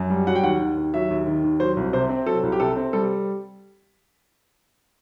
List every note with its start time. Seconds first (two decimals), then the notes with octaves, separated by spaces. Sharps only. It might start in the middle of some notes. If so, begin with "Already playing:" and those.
Already playing: F#2
0.10 G3
0.27 F#3 F#5
0.35 G5
0.43 D#2 F#5
0.60 D#3
0.77 D#2
0.94 F#3 E5
1.10 D#2
1.27 D#3
1.44 D#2
1.60 F#3 C5
1.77 C2
1.93 C3 C5
2.09 C4
2.26 F#3 A4
2.43 C2
2.52 G4
2.60 C3 A4
2.76 C4
2.93 G3 A4